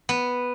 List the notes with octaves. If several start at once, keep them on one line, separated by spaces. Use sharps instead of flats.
B3